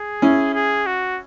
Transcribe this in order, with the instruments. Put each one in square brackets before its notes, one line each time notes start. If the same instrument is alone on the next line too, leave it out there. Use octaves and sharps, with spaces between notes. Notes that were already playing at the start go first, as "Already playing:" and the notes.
Already playing: [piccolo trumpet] G#4
[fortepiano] C#4 E4
[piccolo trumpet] G#4
F#4